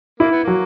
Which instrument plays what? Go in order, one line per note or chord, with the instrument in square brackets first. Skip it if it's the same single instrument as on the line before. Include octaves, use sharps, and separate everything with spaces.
[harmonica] A#3 [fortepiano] E4
[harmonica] B3
[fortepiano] F#3 [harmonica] A#3